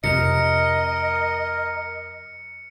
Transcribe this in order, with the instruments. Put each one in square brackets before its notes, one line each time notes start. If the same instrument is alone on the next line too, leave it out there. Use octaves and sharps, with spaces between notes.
[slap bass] F2 C3 [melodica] A#4 [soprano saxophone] D#5 [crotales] C#7